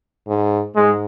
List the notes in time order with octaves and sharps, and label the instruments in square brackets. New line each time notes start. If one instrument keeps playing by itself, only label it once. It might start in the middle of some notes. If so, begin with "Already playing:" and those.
[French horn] G#2
[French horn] G#2 [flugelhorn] G#3